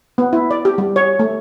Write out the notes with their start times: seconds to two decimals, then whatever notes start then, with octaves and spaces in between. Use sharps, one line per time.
0.18 B3
0.33 E4
0.51 D5
0.65 G4
0.78 G3
0.96 C#5
1.19 A3